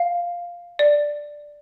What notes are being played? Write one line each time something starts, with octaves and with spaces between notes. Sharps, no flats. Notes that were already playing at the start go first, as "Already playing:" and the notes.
Already playing: F5
D5